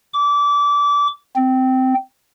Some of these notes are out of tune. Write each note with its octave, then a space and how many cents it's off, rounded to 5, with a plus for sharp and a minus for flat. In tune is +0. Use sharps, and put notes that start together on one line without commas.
D6 -25
C4 -15